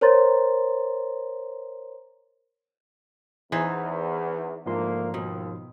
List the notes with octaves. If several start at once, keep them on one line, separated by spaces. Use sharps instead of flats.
A#4 C5 C#5 A#5 C6 A6
E2 E3 D#4 C5
D2 G#2 F3 A#3 C6
D#2 B2